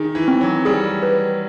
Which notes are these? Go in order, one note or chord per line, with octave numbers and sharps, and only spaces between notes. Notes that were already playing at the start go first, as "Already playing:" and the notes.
Already playing: D#3 G#4
E3
C4
F#3
G3 G#4
B4